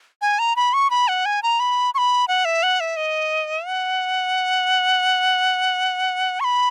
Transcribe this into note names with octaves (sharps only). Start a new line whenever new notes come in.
G#5
A#5
B5
C#6
B5
F#5
G#5
A#5
B5
C#6
B5
F#5
E5
F#5
E5
D#5
F#5
C#6
B5